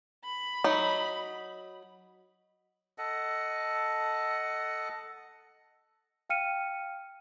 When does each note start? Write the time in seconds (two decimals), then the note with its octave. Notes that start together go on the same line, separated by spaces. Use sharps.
0.24 B5
0.64 F#3 D#4
2.98 A4 D#5 F#5
6.30 F5 G5 F6 C#7 D#7